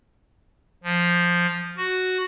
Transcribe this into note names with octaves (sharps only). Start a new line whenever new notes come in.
F3
F#4